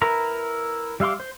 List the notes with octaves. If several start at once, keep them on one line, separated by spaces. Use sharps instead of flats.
E4 A#4 B4 A#5
G3 E5 F5 C6 D6
C5